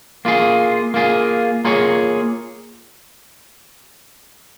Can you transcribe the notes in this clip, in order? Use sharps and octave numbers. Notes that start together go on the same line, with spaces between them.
A#3 F4 G#4
A#3 F4 G#4
A#3 F4 G#4 C#5